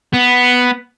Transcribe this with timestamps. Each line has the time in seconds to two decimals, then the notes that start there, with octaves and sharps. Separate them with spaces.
0.14 B3